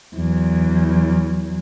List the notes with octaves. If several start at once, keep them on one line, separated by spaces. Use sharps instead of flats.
E2 F#3